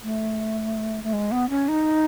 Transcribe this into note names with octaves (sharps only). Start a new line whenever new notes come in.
A3
A3
G#3
B3
C#4
D#4